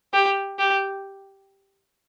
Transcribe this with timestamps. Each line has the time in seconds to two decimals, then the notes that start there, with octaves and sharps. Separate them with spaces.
0.14 G4
0.59 G4